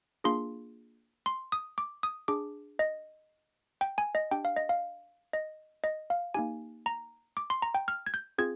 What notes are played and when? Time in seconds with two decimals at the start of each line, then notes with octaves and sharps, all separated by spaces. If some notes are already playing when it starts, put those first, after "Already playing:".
0.24 A#3 D4 F4 G#4 C6
1.26 C6
1.52 D#6
1.78 D6
2.03 D#6
2.28 D4 G#4 D6
2.79 D#5
3.81 G5
3.98 G#5
4.15 D#5
4.31 D4 G4 G5
4.45 F5
4.56 D#5
4.69 F5
5.33 D#5
5.84 D#5
6.10 F5
6.34 A#3 D#4 G4 G#5
6.86 A#5
7.37 D6
7.50 C6
7.62 A#5
7.74 G5
7.88 F6
8.07 G#6
8.14 G6
8.38 C4 F4 G#4 G#6